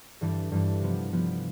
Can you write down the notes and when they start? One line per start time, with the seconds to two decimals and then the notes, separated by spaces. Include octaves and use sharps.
0.21 G2 E3 G3 D4
0.52 G2 E3 G3 D4
0.81 C3 F3 B3
1.12 C3 F3 B3